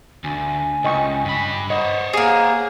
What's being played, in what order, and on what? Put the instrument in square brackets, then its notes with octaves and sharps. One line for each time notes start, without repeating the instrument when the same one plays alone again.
[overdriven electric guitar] D2 [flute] G#5
[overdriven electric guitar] C#2 [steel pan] D#5 G5 C#6
[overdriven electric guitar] G2 B5
[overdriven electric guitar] C5 C#5 [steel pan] D#5 [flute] F#5
[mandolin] A#3 G#4